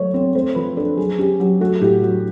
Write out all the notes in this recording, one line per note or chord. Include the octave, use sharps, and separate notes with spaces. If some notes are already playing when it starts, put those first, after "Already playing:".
Already playing: F#3 A3 C#5
C4 C#5
A3 C5
F3 B4
D4 A4
F#3 G#4
C#4 G4
F#3 G4
A3 F#4
A2 G4
F#3 F#4